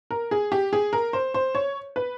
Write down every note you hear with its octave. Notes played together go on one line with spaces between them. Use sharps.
A#4
G#4
G4
G#4
A#4
C5
C5
C#5
B4